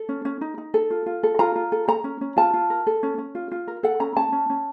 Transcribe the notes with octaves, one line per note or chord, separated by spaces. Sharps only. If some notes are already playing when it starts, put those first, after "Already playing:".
Already playing: A4
C#4
C#4
D#4
D#4
A4
F4
F4
A4
F4 A#5
F4
A4
A4 A#5
C#4
C#4
F4 A5
F4
A#4
A4
C#4
C#4
F4
F4
A#4
A4 F#5
C#4 A#5
C#4 A5
C#4
C#4